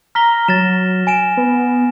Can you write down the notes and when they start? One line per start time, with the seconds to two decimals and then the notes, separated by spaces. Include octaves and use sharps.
0.15 A#5 F6 B6 G7
0.48 F#3 A6 A#6 E7
1.07 G#5 D7 E7
1.37 B3